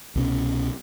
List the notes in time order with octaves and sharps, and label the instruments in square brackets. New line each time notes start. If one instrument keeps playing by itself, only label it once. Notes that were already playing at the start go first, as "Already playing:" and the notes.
[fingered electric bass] C2 B2 C#4